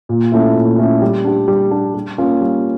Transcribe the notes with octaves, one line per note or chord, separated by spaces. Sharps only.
A#2
A3 C#4 E4
A#2
A3 C#4 E4
G3
D4 G4
G3
D4 G4
G3
A#3 C#4 F4
G3